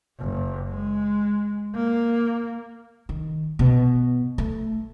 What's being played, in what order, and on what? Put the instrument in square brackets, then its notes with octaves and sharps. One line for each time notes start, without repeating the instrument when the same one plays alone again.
[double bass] F#1
G#3
A#3
[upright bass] D#3
B2
A3